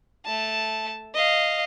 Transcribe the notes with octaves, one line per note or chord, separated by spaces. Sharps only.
A3 A5
D#5 F5